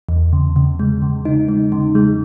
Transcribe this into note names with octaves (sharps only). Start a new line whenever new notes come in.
E2
C#3
C#3
G#3
C#3
D#4
G#3
C#3
G#3